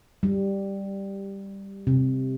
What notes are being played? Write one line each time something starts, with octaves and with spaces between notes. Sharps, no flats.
G3
C3